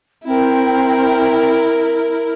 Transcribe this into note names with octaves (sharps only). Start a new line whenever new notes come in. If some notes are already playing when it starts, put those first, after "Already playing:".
C4 E4 A#4